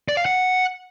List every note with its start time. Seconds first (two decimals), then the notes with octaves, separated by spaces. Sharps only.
0.09 D5
0.17 F5
0.26 F#5